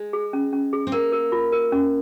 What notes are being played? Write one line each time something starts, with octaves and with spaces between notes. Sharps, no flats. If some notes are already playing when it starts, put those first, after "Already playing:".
Already playing: G#3
G#4
C#4
C#4
G#4
C4
A#3 A#4
A#4
F4
A#4
C#4